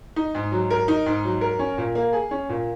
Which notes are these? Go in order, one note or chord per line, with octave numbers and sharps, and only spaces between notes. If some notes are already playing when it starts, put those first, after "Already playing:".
D#4
G#2
F#3
A#4
D#4
G#2
F#3
A#4
C#4
A#2
A#3
G#4
C#4
A#2